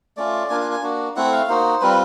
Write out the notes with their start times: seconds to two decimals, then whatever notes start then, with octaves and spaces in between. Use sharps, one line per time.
0.17 A3 C#4 F4 D5
0.50 A#3 D4 F4 G#5
0.60 G#5
0.71 G#5
0.82 A#3 D4 F#4
1.16 A3 C4 E4 F#5
1.32 F5
1.48 A#3 D#4 F#4 C5
1.81 G3 C4 F4 B4